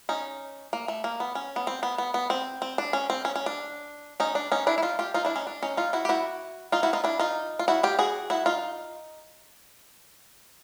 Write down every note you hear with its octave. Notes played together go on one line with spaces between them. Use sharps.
C#4 D#4
A#3
A3
A#3
B3
C#4
B3
C4
B3
B3
B3
C4
C4
D4
C#4
C4
C#4
C#4
D4
C#4 D#4
D4
C#4 D#4
D4 E4
E4
D#4 F4
F4 G4
D#4 F4
D4 E4
C#4 D#4
D4
C#4 D#4
D#4 F4
E4 F#4
G4
E4 F#4
D#4 F4
E4 F#4
D#4 F4
D4 E4
D#4 F4
F4
E4 F#4
F4 G4
F#4 G#4
E4 F#4
D#4 F4